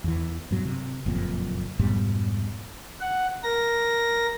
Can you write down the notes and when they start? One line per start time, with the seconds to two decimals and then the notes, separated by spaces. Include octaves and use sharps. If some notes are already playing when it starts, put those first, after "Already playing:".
0.04 E2 E3
0.51 G2 B2 F#3
0.65 C3
1.06 F#1 F2 A#2
1.79 F2 G#2 B2 G3
3.01 F#5
3.44 A#4 A#6